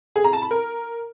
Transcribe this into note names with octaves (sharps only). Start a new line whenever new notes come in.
G#4
A#5
A5
B5
A#4